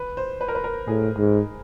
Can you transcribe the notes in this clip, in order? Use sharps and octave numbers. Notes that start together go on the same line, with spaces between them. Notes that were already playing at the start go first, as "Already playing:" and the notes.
Already playing: B4
C5
B4
A#4
B4
A#4
A2 G#4
G#2